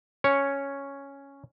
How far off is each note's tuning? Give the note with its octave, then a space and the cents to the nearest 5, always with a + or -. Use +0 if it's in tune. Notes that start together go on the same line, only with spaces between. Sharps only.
C#4 +0 C#5 +0